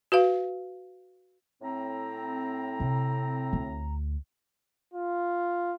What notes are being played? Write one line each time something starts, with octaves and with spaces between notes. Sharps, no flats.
F#4 B4 F5
A2 C4 A#5
C3
D2
F4